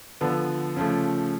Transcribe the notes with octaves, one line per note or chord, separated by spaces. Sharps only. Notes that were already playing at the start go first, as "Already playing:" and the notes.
D3 F3 B3
C#3 F3 A3